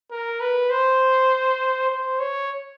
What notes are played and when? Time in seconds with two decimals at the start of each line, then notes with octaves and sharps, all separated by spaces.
0.11 A#4
0.40 B4
0.70 C5
1.90 C5
2.19 C#5